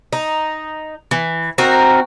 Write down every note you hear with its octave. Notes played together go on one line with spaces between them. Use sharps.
D#4
E3
C4 D#4 F#4 A#4